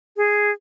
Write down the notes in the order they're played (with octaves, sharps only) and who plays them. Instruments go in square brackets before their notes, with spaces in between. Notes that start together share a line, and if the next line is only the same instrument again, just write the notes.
[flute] G#4